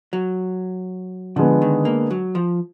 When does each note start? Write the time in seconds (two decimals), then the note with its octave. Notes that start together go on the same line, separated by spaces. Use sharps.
0.13 F#3
1.36 D3 F3 G#3 B3
1.62 D#3
1.85 A#3
2.11 F#3
2.35 F3